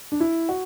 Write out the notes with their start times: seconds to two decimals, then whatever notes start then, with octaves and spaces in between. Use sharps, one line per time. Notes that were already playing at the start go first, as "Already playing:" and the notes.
0.12 D4
0.20 E4
0.49 F#4